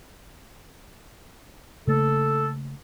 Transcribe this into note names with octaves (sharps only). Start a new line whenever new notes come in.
C#3 A3 A#3 A4